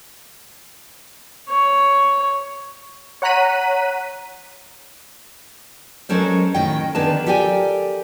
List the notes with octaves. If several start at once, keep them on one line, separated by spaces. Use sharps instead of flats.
C#5
C#5 F#5 A#5 F#6 B6 D#7
F#3 G#3 C#4 A4 A#4 C5
A2 D#3 C#4 D#5 G5
D3 D#3 B3 G#4 B4 A5
G4 A4 A#4 D5 G5 G#5